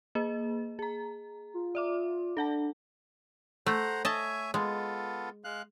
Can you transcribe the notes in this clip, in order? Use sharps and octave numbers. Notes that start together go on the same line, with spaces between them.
A#3 G#4 D#5
G#4 A#5
F4
D5 E5 D6
D4 A4 F#5 A5
A3 C5 F#5 A#5
C#5 D#5 E5 G#5 A5
G#3 B3 F4 A4
G#3 F5 F#6